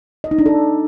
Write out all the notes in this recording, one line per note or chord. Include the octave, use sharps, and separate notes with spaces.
D#5
D#4
D4
A4